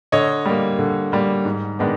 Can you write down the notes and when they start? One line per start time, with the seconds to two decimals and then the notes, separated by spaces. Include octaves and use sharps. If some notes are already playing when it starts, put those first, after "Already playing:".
0.12 D3 C#5 D#5
0.46 G3 A#3
0.79 D3
1.12 G3 A#3
1.45 G#2
1.79 D#3 G#3 B3 D4